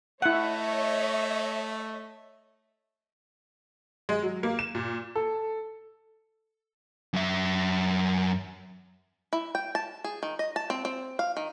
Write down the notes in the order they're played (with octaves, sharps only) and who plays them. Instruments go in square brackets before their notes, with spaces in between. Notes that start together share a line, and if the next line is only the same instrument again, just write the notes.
[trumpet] A3 [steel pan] E4 F#5 [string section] C#5 D#5 E5
[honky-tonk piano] G#3
F#3
A#3
E7
A#2
[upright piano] A4
[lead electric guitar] F#2 E5
[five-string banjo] E4
G5
A5
G#4
D#3
D#5
A5
C4
C4
F5
D#3